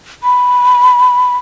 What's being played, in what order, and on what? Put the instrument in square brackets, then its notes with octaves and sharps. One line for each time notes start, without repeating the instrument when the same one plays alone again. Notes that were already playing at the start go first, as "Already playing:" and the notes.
[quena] B5